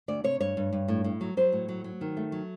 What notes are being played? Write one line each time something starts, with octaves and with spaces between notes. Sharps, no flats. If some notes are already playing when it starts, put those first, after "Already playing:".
D2 D5
C3 C#5
G2 C#5
G2
G2
A2
A2
F#3
F#3 C5
A2
F#3
F#3
D#3
A3
F#3